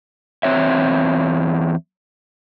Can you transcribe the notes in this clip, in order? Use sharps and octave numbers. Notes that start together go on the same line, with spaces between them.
E2 C4 C#5 E5